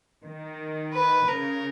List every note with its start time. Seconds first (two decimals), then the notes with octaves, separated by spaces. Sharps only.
0.24 D#3
0.93 B4
1.27 C#3 A#4